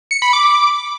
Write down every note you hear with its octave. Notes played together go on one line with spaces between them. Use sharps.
C#7
B5
D6